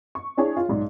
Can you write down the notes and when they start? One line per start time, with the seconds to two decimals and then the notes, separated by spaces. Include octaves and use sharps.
0.15 C#6
0.37 D4 E4 G#4 C#5
0.57 F4
0.69 B1 G#2 D5